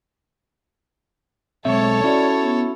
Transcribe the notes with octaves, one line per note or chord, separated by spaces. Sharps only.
B1 G#3 C4 A4 C#5 E5
C#4 E4 F#4 D5
B3